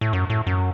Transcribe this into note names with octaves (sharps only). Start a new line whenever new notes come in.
A2
F#2
A2
F#2